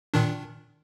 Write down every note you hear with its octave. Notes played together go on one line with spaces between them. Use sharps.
A#2 D#3 D4